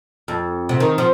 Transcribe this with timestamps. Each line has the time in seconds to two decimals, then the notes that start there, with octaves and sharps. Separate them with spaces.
0.28 F2
0.69 C3
0.80 D#3
0.98 F3